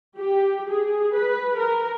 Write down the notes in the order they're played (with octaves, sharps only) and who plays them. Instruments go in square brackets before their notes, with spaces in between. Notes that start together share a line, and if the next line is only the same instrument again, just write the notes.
[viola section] G4
G#4
B4
A#4